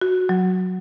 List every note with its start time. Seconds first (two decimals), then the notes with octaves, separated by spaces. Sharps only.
0.01 F#4
0.29 F#3